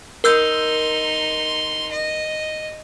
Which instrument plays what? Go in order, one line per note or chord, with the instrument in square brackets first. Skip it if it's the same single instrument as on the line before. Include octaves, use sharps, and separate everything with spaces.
[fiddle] D#4 C6 [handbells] A#4 E6 G6
[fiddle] D#5